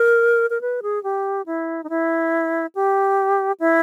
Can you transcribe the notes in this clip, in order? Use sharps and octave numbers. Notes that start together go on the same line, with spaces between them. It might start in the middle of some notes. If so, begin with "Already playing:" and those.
Already playing: A#4
A#4
B4
G#4
G4
E4
D#4
E4
G4
E4